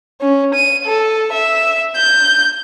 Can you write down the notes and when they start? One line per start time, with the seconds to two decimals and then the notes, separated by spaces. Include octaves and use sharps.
0.21 C#4
0.55 D#7
0.86 A4
1.32 E5
1.96 G6